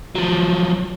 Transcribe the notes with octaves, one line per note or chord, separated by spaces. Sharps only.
F3 F#3